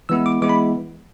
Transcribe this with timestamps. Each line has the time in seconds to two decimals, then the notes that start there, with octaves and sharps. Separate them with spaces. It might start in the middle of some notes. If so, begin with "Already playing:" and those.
0.09 E3 G#3 B3 E4 E6
0.26 D6
0.42 E3 G#3 B3 E4 D6
0.49 B5